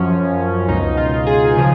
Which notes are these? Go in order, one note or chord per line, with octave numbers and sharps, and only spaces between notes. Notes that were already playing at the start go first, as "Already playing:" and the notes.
Already playing: F#2 F3 C#4
C#2 B2 D#4
F4
G#4
C#3 F3